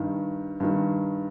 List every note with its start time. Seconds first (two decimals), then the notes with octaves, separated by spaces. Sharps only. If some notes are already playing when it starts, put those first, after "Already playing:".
Already playing: G2 D#3
0.60 G2 D#3